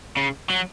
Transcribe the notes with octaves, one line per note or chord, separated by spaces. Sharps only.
C#3
F#3